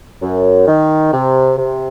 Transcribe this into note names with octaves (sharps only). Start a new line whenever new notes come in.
F#2
D#3
C3
C3